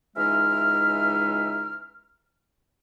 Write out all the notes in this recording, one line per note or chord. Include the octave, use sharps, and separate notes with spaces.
C#2 E3 G#3 D#4 E5 F6